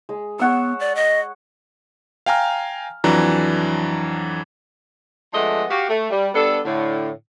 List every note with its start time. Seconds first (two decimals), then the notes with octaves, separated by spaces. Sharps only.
0.09 G#3
0.39 B3 C#5 F#5 E6
0.80 D5
0.95 D#5
2.26 F5 G5 G#5 A#5 F6
3.04 F2 E3 F#3 D4 A#5
5.33 F3 G#3 A3 B3 D4 D#5
5.70 F#4 G4 F5
5.88 A3
6.10 G3
6.34 G3 B3 D4 A4
6.65 A2 D3